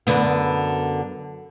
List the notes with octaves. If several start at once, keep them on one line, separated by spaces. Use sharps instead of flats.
F#2 D3 B3